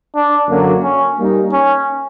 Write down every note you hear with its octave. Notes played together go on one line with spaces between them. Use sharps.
D4
F#2 D3 F#3 A#3 D4
C#4
G3 A#3 D#4
C#4